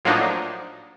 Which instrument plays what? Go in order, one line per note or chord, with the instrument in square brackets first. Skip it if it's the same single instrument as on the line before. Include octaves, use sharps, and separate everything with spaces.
[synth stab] A2 F3 F#3 A#3 D4 D#4